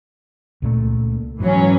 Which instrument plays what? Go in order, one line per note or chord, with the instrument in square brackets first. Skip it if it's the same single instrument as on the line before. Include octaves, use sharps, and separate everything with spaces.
[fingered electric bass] C#2 A#2 A3
[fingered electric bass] G#2 [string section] E3 F#3 C#4